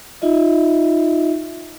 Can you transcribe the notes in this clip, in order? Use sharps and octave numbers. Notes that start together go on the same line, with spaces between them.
D#4 F4 D#5 E5